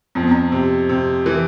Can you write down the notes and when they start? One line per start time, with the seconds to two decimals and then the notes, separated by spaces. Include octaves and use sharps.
0.15 F2 C4
0.23 B3
0.32 C4
0.52 C3
0.89 C3
1.26 E3